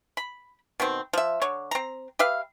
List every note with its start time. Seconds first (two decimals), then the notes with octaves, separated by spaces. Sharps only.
0.17 B5
0.80 B2 D#3 C4
1.13 F3 E5
1.42 D3 C#5
1.71 C4 A#5
2.19 G4 B4 E5 F5